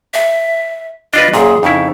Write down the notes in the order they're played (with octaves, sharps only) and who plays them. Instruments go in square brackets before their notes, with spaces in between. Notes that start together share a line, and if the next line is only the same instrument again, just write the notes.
[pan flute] E5
[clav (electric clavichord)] D4 F4 B4 [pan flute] D#5
[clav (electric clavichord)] F#2 A#2 [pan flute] G#4
[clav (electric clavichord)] F2 C#3 E4 [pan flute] D#4